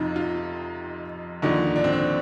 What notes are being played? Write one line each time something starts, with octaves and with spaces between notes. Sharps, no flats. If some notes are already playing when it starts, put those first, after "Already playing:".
Already playing: F2 C3 D#4 F4
F4
D#2 D3 F3 D#4
D#4
D4
C4
D4